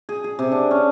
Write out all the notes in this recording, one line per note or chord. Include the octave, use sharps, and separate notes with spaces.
G#4
G#4
C3
D4
C#4